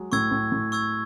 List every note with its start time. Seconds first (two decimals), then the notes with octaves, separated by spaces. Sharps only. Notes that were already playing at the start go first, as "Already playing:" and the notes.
Already playing: F#3 G#3
0.12 A2 C#6 E6 G#6
0.32 A2
0.52 A2
0.72 C#6 E6 G#6